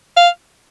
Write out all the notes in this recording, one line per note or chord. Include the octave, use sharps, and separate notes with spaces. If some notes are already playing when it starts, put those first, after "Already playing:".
F5